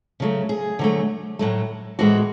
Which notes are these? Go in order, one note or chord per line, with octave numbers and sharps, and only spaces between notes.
C#3 F#3 A3
G#4
D3 F#3 A3
A2 F#3 A3
A2 E3 G#3 F#4